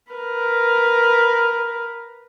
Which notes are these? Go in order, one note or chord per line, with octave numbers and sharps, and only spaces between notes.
A#4 B4